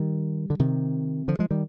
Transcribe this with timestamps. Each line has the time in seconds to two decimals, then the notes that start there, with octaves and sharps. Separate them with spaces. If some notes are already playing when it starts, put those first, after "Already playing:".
Already playing: D#3 G3
0.50 D3
0.59 C3 D#3
1.28 D3 F3
1.39 F3 G#3
1.51 D#3 G3